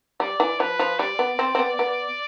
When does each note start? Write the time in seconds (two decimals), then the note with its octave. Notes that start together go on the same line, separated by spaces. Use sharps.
0.20 G3 D5
0.40 E3
0.60 F3 B4
0.79 F3
0.99 G3 D5
1.19 B3
1.39 C4
1.55 C4
1.59 B3
1.79 B3